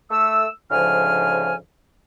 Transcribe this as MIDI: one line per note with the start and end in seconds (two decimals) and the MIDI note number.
0.11 0.47 57
0.11 0.47 88
0.71 1.55 38
0.71 1.55 44
0.71 1.55 49
0.71 1.55 53
0.71 1.55 80
0.71 1.55 89